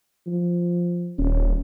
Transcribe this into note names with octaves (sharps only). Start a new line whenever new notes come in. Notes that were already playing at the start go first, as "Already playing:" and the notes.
F3
D#1 C#4